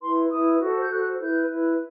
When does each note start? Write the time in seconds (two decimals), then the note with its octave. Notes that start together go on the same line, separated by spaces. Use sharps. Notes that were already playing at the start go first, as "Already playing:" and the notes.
0.01 E4 B4 C6
0.31 E4 B4 D#6
0.61 F#4 A4 C5
0.81 G6
0.90 F#4 A4 C5 F#6
1.20 E4 B4 G6
1.49 E4 B4